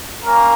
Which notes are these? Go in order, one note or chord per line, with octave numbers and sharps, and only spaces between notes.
A#3 C#4 A#4